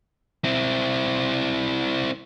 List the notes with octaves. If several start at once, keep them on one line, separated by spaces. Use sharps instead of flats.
C4 E4